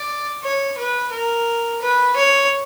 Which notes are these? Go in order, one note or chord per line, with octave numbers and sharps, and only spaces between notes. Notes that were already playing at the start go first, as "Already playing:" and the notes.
Already playing: D5
C#5
B4
A#4
B4
C#5